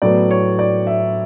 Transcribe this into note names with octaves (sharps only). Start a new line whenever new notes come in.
A2 F#3 B3 D5
C#5
D5
E5